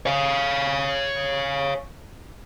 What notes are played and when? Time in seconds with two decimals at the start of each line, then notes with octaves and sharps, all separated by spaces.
0.06 C#5 F5